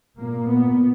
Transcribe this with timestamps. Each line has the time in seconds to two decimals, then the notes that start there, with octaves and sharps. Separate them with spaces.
0.18 A#2 A#3
0.50 B3